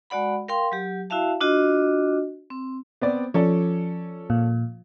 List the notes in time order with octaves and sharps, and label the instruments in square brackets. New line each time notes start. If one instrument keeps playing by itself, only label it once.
[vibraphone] G#3 F#4 D5 F#5 B5
A#4 F5 G5 C6
F#3 G4
E4 F#4 E5 F5 A5
D4 F4 F#4 D#5
C4
[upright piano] B3 C4 D5
[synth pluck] F3 [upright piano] C#4 A4 D5
[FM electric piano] A#2